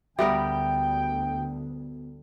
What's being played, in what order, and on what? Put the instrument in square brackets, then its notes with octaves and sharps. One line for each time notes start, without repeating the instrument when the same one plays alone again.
[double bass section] D2 [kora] G3 B3 A#4 [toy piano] E5 [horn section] G5